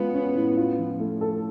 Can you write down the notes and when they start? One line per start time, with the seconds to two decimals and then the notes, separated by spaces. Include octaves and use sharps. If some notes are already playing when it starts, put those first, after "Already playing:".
Already playing: G#3 B3 C#4 F4
0.14 C#4
0.35 A2
0.57 F4
0.79 F3
1.00 A3
1.21 A4